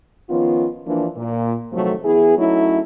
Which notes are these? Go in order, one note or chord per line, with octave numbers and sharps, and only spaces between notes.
D#3 F3 B3 C#4 F4
E3 F3 A#3 D4
A#2
C3 D#3 F3 F#3 A3
E3 B3 E4 G#4
F#3 A3 C#4 D#4 E4